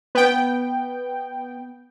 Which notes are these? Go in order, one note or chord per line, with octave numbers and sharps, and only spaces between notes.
B3 G5